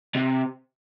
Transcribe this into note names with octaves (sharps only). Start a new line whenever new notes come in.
C3